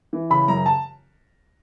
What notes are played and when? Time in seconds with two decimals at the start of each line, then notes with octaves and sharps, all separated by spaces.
0.13 E3
0.30 C#3 B5
0.48 F#2 A#5
0.66 A5